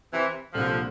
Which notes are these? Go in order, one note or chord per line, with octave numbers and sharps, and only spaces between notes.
C3 E3
C2 A#2 D3 F3 G3